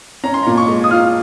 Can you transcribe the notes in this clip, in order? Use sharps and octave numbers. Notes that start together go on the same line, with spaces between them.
C#4 A#5
C6
A#2 A#5
C#6
G#3
D#6
F4 F6